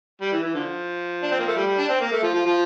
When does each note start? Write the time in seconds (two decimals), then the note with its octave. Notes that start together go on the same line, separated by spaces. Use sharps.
0.22 G3
0.32 E3
0.43 E3
0.54 D3 F3
1.23 D4
1.32 C4
1.39 A#3
1.48 A3
1.56 G3
1.67 G3
1.78 D4
1.89 C4
2.01 A#3
2.12 A3
2.24 F3
2.35 F3
2.46 F3